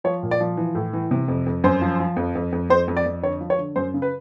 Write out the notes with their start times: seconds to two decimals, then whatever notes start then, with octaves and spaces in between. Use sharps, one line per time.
0.04 F3 C#5
0.23 A#2
0.31 D5
0.40 F3
0.57 E3
0.75 A2
0.93 E3
1.11 C3
1.28 F2
1.46 F2
1.64 F#2 C5
1.81 F3
2.00 F3
2.16 F2
2.35 F2
2.52 F2
2.70 F2 C5
2.88 F2
2.97 D5
3.06 F2
3.22 D3 C#5
3.41 F3
3.50 C#5
3.59 D3
3.76 F#2 C5
3.94 C#3
4.02 B4